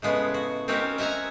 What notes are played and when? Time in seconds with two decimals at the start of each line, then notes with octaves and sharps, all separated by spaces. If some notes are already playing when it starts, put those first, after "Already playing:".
0.02 A2 C#3 G#3 B3
0.34 F#4
0.68 C4 C#4 D#4 F#4 G4 A#4
0.98 D#5 E5 F#5 G#5 A#5